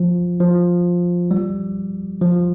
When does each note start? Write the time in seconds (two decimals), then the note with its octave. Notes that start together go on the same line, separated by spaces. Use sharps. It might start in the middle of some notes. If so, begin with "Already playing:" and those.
Already playing: F3
0.40 F3
1.31 G3
2.22 F3